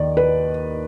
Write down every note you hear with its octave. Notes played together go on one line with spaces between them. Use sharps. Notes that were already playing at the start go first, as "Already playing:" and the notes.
Already playing: D#2 D#3 D5
B4